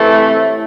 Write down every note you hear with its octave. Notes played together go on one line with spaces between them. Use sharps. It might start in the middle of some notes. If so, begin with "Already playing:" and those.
Already playing: C3 E3 A3
A2